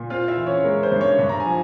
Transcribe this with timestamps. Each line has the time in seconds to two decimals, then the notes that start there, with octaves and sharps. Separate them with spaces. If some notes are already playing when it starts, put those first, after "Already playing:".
Already playing: A#2
0.10 C4 F4 F5
0.28 E4 E5
0.37 E3
0.46 C#4 C#5
0.65 G#3 A#4
0.83 C5
0.92 G2
1.01 C#4 C#5
1.19 G2
1.29 A#5
1.40 G#5
1.46 F3